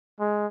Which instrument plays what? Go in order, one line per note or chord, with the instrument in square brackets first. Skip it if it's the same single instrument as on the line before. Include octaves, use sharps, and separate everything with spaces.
[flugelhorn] G#3